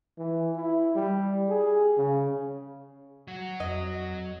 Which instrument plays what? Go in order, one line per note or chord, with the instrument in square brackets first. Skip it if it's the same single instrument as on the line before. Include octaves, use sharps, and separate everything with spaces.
[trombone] E3
E4
G3
G#4
C#3
[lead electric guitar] F#3 F#4
[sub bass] F2 [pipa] D#5